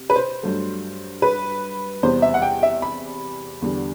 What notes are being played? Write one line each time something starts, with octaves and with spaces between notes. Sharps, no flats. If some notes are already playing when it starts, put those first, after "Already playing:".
Already playing: C3
B4
C5
G2 F#3 A3
B4
E2 C3 G3 B3 C5
E5
F#5
G5
E5
B5
E2 D3 G3 B3